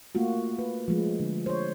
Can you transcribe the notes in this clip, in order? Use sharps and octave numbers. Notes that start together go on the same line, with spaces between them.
A3 A#3 F4 F#4
B4
F3 G#3 A3
D3
C5 C#5